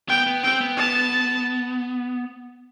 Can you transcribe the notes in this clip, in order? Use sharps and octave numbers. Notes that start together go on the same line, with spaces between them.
B3 G5
B3
C4 G5
B3
A5